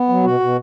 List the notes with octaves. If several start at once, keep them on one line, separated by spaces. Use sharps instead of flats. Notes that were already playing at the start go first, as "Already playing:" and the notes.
Already playing: B3
F#3
B2 F#4
B2